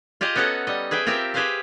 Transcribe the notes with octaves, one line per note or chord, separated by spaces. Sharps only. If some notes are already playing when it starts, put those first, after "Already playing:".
F4 G4 G#4 D#5 F5
B3 C#4 F#4 A4 D#5 A#5
G3 D#5
G#4 B4 E5 G5
C4 F4 G4 A#4 E5
G4 G#4 B4 C5 E5 F5